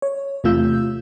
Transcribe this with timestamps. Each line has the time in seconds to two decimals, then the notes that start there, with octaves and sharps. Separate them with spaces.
0.02 C#5
0.44 E2 C3 A3 F4 E6 G6